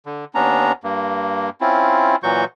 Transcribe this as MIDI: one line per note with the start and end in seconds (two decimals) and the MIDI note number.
0.06 0.25 50
0.35 0.72 39
0.35 0.72 59
0.35 0.72 61
0.35 0.72 62
0.35 0.72 82
0.84 1.50 43
0.84 1.50 58
1.61 2.16 60
1.61 2.16 61
1.61 2.16 64
1.61 2.16 65
2.23 2.45 46
2.23 2.45 52
2.23 2.45 54
2.23 2.45 66
2.23 2.45 85
2.23 2.45 91